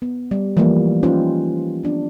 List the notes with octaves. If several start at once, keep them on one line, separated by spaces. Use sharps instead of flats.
B3
G3
E3 F3 G3 A3 A#3
C#4 D#4 F4 G4 B4 C5
B3 D4